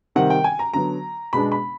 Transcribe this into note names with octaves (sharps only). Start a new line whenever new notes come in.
C3 D#3 G3 C4 F#5
G5
G#5
A#5
D3 F#3 B3 A#5
B2 G#3 B3 D4 B5
B5